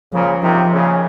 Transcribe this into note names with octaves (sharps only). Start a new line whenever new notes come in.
A#2 C#3 F3
C3 D#3 F3
A#2 C#3